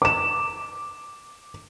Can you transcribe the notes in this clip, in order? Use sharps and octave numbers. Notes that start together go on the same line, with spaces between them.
D6 E7